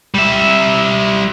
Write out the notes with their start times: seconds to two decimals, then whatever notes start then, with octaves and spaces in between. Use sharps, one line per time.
0.15 G3 E5